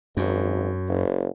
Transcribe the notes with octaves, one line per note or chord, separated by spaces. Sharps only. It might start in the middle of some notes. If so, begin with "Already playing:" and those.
G#1 F#2
F#1